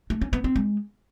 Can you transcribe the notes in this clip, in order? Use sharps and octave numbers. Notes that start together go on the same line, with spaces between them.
A3
C#4
B3
C4
G#3